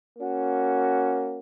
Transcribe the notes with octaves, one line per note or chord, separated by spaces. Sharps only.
A#3 C#4 F#4